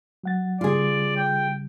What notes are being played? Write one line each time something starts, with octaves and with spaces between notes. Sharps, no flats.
F#3 F#5 A6
C#3 G3 F4 G#4 D5
G5